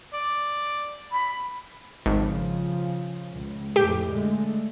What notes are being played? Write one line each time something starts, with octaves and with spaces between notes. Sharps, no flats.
D5
B5
G#1 C#3 F3
C#2
F2 A2 G4
D3 G#3 A3